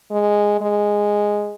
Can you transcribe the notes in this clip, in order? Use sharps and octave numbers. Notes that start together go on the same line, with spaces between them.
G#3
G#3